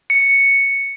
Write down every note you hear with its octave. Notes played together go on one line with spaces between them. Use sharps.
C#7